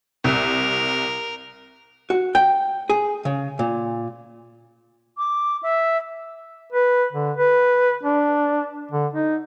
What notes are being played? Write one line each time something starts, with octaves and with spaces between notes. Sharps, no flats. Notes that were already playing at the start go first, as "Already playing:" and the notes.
C2 A#4
F#4
G5
G#4
C#3
A#2
D6
E5
B4
D3
B4
D4
D3
D#4